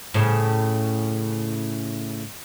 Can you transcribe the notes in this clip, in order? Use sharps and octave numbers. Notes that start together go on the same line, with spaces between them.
A2 C#3